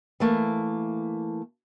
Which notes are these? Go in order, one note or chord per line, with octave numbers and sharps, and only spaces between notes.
E3 A3 A#3